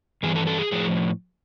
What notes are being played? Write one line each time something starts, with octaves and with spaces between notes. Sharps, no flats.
G2 E3 G#4
A4
A4
G#4
A2 F3 G#4